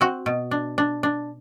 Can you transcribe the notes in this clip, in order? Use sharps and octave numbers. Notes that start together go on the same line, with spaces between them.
C4 F#4
B2
D4
D4
D4